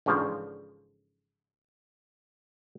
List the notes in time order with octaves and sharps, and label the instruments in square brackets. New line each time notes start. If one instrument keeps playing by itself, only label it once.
[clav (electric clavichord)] A1 G#2 C#3 F3 D4 C5